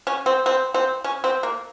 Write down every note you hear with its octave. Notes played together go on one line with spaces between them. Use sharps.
C#4
C4
C4
C4
C#4
C4
A#3